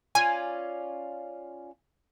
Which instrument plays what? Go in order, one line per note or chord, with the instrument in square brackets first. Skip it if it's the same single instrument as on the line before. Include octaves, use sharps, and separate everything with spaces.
[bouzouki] C#4 F4 D5 [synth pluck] G#5